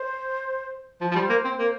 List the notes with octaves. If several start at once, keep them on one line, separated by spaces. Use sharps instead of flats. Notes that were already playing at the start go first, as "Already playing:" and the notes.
Already playing: C5
F3 C5
F3
G3
A#3
C4
A#3